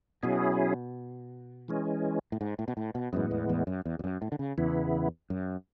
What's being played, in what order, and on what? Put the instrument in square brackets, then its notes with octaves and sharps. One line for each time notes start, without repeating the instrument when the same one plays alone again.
[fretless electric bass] B2 [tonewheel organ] F#3 C#4 E4 G#4
[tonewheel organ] E3 G#3 C#4
[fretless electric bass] A2
G#2
A2
B2
A2
B2
[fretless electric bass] F#2 [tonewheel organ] A2 E3 G#3 B3
[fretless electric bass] E2
E2
F#2
E2
E2
F#2
A2
D3
C#3
[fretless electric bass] E2 [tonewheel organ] C#3 E3 B3 E4
[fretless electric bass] F#2